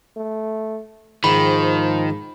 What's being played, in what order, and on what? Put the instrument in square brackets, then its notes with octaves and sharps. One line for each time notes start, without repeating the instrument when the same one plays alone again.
[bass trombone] A3
[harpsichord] G#2 [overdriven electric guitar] D#3 [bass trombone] F3 [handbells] B5